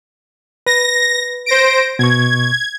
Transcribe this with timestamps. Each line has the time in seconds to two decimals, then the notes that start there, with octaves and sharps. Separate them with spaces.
0.66 B4 A#6
1.46 C5 A#6 D7
1.99 B2 C#6 G#6